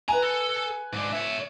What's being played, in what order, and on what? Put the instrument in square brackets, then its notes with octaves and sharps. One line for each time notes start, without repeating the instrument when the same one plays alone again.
[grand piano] B4 G#5 [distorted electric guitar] A#5
[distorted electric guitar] A4
G#2 D4
C#5 E5